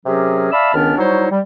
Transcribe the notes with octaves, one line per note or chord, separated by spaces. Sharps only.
C3 F#3 C#4 G4 G#4 A#4
D5 E5 F5 A5 B5 E6
C#2 D#3 B3 C#4 D4 F6
F#3 G3 D#4 E4 C5 C#5
G3